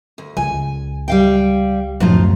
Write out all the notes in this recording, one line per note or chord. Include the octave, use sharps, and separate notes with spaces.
D2
C#2 G#5
G3 F5 G5
D1 F#2 F3 D#4 F4